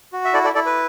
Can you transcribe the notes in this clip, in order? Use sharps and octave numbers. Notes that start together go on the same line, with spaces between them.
F#4
E5
E4 A4 D5
A4 D5
E4 A4 D5
B4